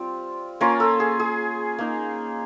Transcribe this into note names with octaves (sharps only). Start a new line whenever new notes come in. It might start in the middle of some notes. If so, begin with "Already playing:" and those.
Already playing: G3 C4 F4
A#3 C#4 F4 A#4
A4
G#4
G#4
A#3 D#4